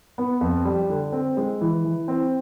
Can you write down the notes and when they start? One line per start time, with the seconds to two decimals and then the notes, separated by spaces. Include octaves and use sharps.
0.18 B3
0.41 F2
0.65 G3
0.89 D3
1.13 C4
1.37 G#3
1.61 E3
1.84 E3
2.08 C4